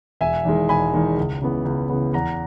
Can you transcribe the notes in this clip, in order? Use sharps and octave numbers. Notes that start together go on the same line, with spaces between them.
E1 E5 G#5
E2 D#3 G#3
E1 G#5 B5
E2 D#3 G#3
C#2
C#3 E3 B3
C#2
C#3 E3 B3
E2 F#5 A#5